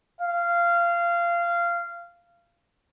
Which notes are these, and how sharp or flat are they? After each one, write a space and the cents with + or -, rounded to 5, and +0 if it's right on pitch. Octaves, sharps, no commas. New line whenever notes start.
F5 -20